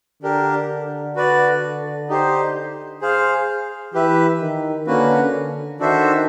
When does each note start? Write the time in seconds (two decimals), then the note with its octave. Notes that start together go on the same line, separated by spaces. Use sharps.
0.22 D3 D4 G4 A#4
1.16 F#4 B4 D5
2.09 D#4 G4 C5
3.01 G#4 C5 F5
3.94 E3 G4 B4 E5
4.41 D#3
4.86 D3 A#3 C#4 F#4 B4
5.33 D3
5.80 D#3 D4 F#4 A4 C5 E5